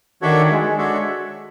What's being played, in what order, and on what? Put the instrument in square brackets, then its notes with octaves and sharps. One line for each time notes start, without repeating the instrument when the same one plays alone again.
[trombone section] D#3 [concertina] D4 F#4 A4 C#5 E5
[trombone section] G#3
[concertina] D4 F#4 A4 C#5 E5